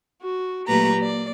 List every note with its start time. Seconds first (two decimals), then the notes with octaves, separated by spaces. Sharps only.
0.22 F#4
0.67 A#2 F#3 A3 G4 B4 A#5
1.00 A#3 D5